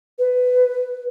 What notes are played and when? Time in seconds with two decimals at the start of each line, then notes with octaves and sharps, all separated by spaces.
0.18 B4